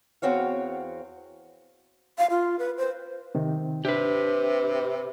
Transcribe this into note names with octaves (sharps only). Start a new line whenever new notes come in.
E2 C4 F#4 C#5 F5
F5
F4
B4
C5
C3 D#3
C3 D4 G4 B4